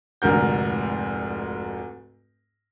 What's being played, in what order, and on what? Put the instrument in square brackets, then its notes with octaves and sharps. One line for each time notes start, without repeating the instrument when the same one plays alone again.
[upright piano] F1 D2 G#2 A#4 G6